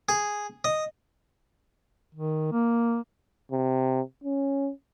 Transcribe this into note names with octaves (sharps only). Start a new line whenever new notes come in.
G#4
D#5
D#3
A#3
C3
C#4